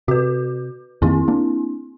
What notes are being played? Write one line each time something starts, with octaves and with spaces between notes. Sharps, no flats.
C3 F#4 B4
F2 D#3 A#3 C4 E4
A#3 D4